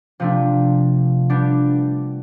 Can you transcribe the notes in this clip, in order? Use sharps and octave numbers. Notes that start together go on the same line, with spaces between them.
C3 F3 A3 D4
G3 B3 D4 G4